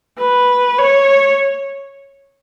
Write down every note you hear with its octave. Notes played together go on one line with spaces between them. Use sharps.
B4
C#5